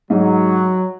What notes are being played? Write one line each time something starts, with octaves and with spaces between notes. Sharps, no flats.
G#2 F#3